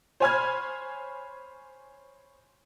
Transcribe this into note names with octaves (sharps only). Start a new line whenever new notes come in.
C5 C#5 G#5 B5 F6 G#6